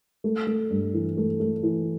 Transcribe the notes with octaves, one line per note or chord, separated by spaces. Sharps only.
A3
A3
G2
E3
A3
A3
E3